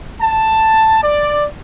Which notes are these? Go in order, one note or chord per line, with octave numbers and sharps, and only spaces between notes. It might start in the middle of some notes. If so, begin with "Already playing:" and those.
A5
D5